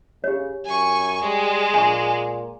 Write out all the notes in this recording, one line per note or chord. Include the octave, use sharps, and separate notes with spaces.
C#3 G4 C#5
F#2 G#5 C#6
G3 G#3
A#2 G#5 C#6